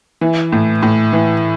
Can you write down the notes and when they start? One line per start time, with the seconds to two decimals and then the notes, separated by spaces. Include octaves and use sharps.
0.21 E3
0.52 A2
0.83 A2
1.13 E3